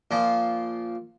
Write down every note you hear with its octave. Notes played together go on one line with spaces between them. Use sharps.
A#2 F3